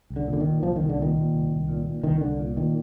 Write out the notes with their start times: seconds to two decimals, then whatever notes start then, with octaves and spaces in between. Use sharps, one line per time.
0.10 C2
0.16 D3
0.28 A#2
0.33 D3
0.40 D#3
0.46 A#2
0.63 C2 F3
0.76 C2 D#3
0.89 D3
0.99 A#2 D#3
1.16 A#2
1.34 C2
1.51 C2
1.69 A#2
1.86 A#2
2.04 C2 D#3
2.21 C2 D3
2.40 A#2
2.57 A#2 D#3